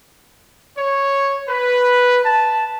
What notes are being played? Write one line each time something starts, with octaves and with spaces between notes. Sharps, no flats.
C#5
B4
A5